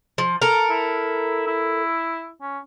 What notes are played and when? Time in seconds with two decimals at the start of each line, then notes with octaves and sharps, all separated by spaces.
0.18 F3
0.42 A4 A#4
0.70 E4
1.47 E4
2.41 C#4